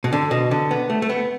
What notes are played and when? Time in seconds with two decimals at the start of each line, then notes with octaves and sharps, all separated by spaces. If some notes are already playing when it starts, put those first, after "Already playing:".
0.04 B2
0.13 D3
0.31 B2
0.51 D3
0.71 B3
0.90 A3
1.02 A3
1.09 B3